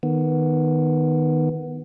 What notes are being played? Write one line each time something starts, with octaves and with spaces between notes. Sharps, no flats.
D#3 B3